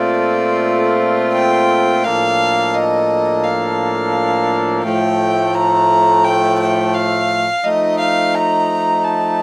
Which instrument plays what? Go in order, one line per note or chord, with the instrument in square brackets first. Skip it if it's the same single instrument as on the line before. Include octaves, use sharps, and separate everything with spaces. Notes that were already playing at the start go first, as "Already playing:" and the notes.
Already playing: [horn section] A#2 A3 C4 F4 A4 [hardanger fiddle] D5
[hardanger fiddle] G5
[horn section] A2 F3 A#3 D4 A4 [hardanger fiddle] F5
[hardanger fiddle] D#5
F5
[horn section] A2 F3 A3 [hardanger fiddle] G5
[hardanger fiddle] A#5
G5
G5
F5
[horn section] F3 A3 D#4 [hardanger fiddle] D#5
[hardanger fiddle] F5
A#5
A5